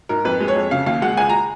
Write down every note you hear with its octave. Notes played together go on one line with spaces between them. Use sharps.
G#2 A#4
F2 B4
G#3
C#5
F2
C#3 F5
D#2 F5
G#3 F#5
C#2 G#5
A#5